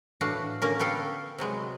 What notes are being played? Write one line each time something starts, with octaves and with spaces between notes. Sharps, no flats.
A2 E3 D4 F#4 F5
D3 A#3 C#4 A#4
B3 G4 A4 F5 G5
C3 F#3 G#3 B3